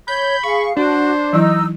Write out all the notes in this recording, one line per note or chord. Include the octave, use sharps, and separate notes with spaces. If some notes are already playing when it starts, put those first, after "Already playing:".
C#5 B5 G6
G#4 F5 C#6
D4 F#4 C5
E3 F#3 D#4 E4 E6